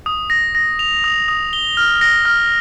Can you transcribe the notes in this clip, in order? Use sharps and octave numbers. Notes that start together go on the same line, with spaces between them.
D#6
A#6
A#6
F7
D#6
D#6
G7
F6
A#6
F6